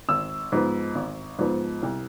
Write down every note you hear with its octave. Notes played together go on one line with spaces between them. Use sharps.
G#1 E6
G#2 F3 B3
G#1
G#2 F3 B3
C2